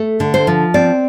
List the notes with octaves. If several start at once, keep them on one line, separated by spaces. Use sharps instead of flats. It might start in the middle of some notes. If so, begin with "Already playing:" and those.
Already playing: A3
D3
C5
F3
C4 D5